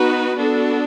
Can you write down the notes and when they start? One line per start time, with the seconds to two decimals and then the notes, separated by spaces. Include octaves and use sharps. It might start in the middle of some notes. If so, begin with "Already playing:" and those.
Already playing: B3 D#4 F#4 B4
0.37 B3 D4 F#4 A4